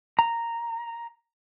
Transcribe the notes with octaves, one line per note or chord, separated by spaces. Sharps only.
A#5